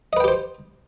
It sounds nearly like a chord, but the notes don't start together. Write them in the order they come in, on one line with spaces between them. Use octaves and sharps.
D#5 B4 G5 G4 C5